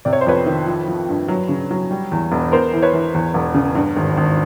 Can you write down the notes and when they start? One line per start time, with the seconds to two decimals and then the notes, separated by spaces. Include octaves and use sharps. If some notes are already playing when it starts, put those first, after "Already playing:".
0.05 C3 D5
0.13 C#5
0.21 C5
0.27 F2 B4 C#5
0.46 D#3
0.67 F3
0.88 F3
1.09 G2
1.28 F#3
1.49 C#3
1.71 F#3
1.91 G3
2.12 E2
2.32 E1
2.52 B3 A#4 C5
2.73 E3
2.82 B4 C#5
2.93 E3
3.15 E2
3.34 E1
3.54 C#3
3.75 G2
3.96 G#1
4.17 G#1